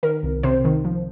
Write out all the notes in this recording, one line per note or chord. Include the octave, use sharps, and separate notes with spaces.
D#3 A#4
C2
C3 C5
D#3
F3